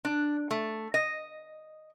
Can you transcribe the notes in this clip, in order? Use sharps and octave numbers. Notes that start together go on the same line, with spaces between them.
D4
A3
D#5